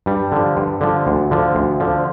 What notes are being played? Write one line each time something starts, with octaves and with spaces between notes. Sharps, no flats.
G2 G3
D3 F3
G2
D3 F3
D2
D3 F3
D2
D3 F3